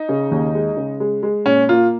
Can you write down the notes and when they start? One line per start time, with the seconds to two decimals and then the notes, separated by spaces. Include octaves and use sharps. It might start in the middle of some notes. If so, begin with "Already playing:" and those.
Already playing: D#4
0.09 C#3
0.32 D#2
0.55 G#3
0.77 C#3
1.00 G#3
1.23 G#3
1.46 A#2 C#4
1.69 A#3 F4